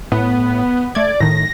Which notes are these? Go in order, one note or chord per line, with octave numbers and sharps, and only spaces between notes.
A2 B3
A3 D5 G#6
A2 D#3 A#6